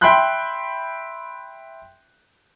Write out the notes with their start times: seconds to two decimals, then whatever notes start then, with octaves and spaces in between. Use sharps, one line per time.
0.01 E5 G5 B5 C6 F#6 G6